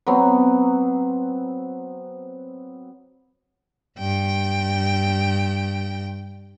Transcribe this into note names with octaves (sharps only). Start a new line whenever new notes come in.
F#3 B3 C4
G2 G5